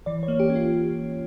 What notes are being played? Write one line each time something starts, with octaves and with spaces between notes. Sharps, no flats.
E3 D5
C#5
A#3
G4
C#4
F4